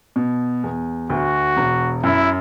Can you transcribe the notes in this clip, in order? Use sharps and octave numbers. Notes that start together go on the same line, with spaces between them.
B2
E2
D2 F#4
E1
F#2 E4